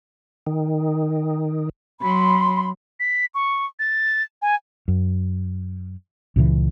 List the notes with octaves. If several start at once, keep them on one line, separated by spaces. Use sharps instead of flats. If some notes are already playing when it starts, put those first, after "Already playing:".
D#3
F#3 B5 C6
B6
C#6
A6
G#5
F#2
C#2 A#2 C#3 E3